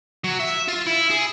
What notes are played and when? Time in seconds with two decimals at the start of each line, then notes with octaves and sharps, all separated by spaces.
0.24 F#3
0.40 E5
0.68 F4
0.86 E4
1.10 G#4